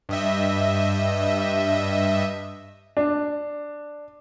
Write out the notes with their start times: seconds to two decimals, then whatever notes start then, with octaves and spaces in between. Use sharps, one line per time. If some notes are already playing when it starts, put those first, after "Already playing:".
0.09 G2 D#5 E5
2.97 D4